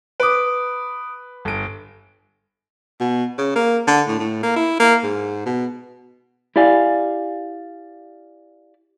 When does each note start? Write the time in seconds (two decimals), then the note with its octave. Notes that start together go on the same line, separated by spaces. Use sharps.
0.20 B4 D6 D#6 D7
1.45 G1 D7
3.00 B2
3.38 C#3
3.56 A#3
3.87 D3
4.08 A2
4.19 A2
4.43 A#3
4.56 E4
4.80 A#3
5.04 G#2
5.46 B2
6.56 E4 G4 D5 F5 G#5